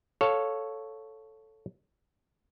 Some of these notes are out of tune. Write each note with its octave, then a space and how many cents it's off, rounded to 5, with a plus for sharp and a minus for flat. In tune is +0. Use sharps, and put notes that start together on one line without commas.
A4 +0 C#5 +0 F5 +10